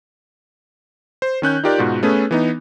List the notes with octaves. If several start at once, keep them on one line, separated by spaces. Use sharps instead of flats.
C5
D#3 C#4 F#6 G6
D#4 F4 G4 A#4 D5
G#2 B2 F4 F#4
A3 B3 C#4 G#4 A4 B4
E3 B3 D#4